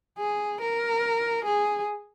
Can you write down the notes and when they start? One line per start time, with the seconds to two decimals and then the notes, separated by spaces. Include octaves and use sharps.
0.18 G#4
0.61 A#4
1.45 G#4